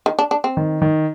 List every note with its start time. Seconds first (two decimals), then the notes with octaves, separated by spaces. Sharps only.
0.06 D#3
0.19 D4
0.31 D4
0.44 C4
0.57 D#3
0.82 D#3